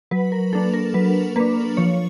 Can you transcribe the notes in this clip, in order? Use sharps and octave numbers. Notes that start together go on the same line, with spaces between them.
F#3 B4
A#4
A#3 D4 A4
A#4
F#3 B4
A#3 D4 B4
F3 C#5